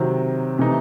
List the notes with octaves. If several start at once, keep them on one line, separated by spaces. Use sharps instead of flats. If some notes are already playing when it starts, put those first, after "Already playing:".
Already playing: C3 D#3 F#3 C4
C3 E3 A3 D#4